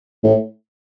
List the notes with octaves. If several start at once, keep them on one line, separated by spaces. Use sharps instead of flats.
A2